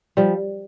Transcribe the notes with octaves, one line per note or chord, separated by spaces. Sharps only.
F3 G3